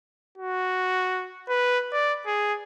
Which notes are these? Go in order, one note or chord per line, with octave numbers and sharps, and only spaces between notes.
F#4
B4
D5
G#4